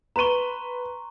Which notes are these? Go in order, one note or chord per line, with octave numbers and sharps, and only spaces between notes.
B4 A#5 C6 C#6 D#7